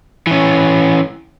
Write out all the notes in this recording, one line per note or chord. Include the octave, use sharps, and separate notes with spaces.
E3 C#4